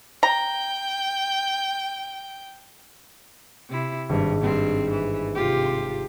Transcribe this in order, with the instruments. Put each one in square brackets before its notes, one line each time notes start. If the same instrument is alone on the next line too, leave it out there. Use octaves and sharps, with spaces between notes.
[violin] G5 [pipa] A#5
[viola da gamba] C3 E4
[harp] G#1 [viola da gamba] G2
[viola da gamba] G2 C4
E3
C3 F4 G4
[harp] C6